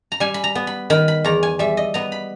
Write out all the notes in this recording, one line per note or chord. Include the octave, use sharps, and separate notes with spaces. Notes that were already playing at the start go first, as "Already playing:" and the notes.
A#5
G3 G#5
B5
A#5
B3
B5
D#3 B5
B5
E2 A#5
G#5
G3 E5
D#5
B3 A#5
B5